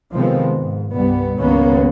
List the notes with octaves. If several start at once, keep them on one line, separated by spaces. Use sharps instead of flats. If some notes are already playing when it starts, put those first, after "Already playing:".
C3 D#3 F3 G#3 B3 C4
G#2
C2 G2 G3 B3
C#2 G2 D#3 A#3 B3 C#4